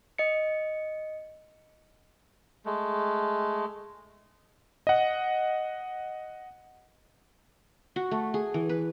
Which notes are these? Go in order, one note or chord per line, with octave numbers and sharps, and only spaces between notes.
D#5 C#7
G#3 A3
D#5 F#5
F#4
A3
G#4
E3
B4